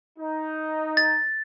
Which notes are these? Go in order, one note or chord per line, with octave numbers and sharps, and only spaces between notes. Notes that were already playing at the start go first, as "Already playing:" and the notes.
D#4
A6